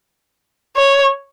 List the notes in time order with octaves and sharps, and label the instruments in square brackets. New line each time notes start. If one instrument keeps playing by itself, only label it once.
[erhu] C#5